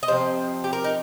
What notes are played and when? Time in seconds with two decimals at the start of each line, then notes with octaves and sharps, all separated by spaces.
0.03 D#5
0.08 C3 F3 C4 C5
0.64 G4
0.73 A#4
0.84 D#4